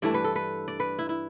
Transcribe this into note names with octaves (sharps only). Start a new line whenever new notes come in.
G2 E3 A3 D4 D5
B4
A4
B4
D5
B4
E4
E4